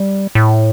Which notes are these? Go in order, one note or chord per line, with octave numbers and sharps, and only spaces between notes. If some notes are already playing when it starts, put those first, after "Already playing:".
Already playing: G3
A2